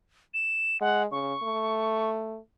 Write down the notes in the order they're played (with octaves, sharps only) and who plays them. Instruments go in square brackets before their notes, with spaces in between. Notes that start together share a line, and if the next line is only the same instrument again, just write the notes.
[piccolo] E7
[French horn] G#3 [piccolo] F#5
[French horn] C#3 [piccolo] C#6
[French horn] A3